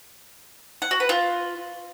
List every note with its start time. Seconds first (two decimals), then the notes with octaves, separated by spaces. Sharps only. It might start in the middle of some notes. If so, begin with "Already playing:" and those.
0.82 F#5
0.91 F#4
1.00 B4
1.09 F4